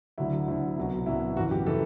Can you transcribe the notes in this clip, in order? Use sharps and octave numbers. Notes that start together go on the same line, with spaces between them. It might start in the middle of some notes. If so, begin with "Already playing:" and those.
D2 D3 F#3 E4
D2 D3 F#3 E4
C2 B2 F#3
C2 B2 F#3 E4
G1 F#2 E3 F#4
G4
E3 A4